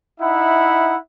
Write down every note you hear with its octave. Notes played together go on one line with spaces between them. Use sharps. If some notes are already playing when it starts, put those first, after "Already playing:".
D#4 E4 E5 F#5 B5